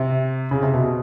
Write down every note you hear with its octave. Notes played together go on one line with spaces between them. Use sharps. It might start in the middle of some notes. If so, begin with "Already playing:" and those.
Already playing: C3
C#3
C3
B2